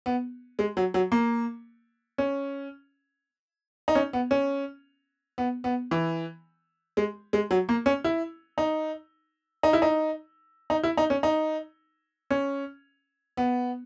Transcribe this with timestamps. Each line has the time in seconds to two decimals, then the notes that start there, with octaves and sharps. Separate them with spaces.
0.06 B3
0.59 G#3
0.77 F#3
0.94 F#3
1.12 A#3
2.18 C#4
3.88 D#4
3.95 C#4
4.13 B3
4.31 C#4
5.38 B3
5.64 B3
5.91 E3
6.97 G#3
7.33 G#3
7.51 F#3
7.69 A#3
7.86 C#4
8.04 E4
8.58 D#4
9.63 D#4
9.73 E4
9.82 D#4
10.70 D#4
10.83 E4
10.97 D#4
11.10 C#4
11.23 D#4
12.31 C#4
13.37 B3